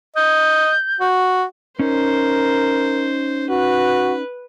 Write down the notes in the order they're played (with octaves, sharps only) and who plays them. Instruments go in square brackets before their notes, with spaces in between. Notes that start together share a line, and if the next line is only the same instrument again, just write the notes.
[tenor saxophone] D#5 [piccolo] G6
[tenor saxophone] F#4
[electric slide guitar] C#4 D#4 [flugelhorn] A#4 [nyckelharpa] C5
[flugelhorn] F#4 [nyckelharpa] B4